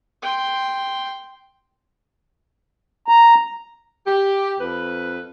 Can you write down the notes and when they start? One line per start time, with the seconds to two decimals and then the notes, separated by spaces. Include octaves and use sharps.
0.22 G5 C6
3.08 A#5
4.06 G4
4.59 F2 B4